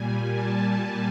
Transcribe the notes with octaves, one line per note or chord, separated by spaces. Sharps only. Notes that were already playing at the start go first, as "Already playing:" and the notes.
Already playing: A#2 G3 G#5
A5